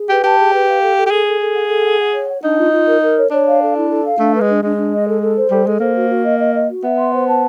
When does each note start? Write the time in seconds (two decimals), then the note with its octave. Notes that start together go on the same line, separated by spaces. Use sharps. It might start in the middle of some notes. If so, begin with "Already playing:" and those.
Already playing: G#4
0.09 G4 B4
0.23 G4 A5
0.38 G#4
0.53 B4
0.67 F5
0.82 A4
0.97 A4
1.06 G4
1.11 G#4 A4
1.26 A4
1.41 A4
1.55 F#5
1.69 A4
1.84 F#5
1.99 F#5
2.13 C#5
2.29 F#5
2.43 D4 D#4
2.58 F4
2.72 F4
2.87 A#4
3.02 A#4
3.16 C#5
3.31 D4 C#5
3.46 F5
3.61 A4
3.75 E4
3.90 A4
4.04 F5
4.19 A3 D4
4.34 B4
4.40 G#3
4.48 D4
4.63 G#3 D4
4.77 D4
4.92 D#5
5.07 A4
5.22 A4
5.36 C5
5.50 G3 A4
5.66 G#3 A4
5.80 A#3 C5
5.95 F#4
6.10 F#4
6.25 D#5
6.40 D#5
6.54 D#5
6.69 F#4
6.83 B3 E5
6.98 C6
7.12 C5
7.27 A5